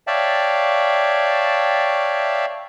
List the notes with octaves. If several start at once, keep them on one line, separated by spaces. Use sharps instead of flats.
C#5 D5 E5 F5 G5 A5